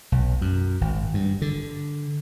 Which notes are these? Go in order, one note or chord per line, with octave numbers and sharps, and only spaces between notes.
B1
F#2
G#1
G2
D3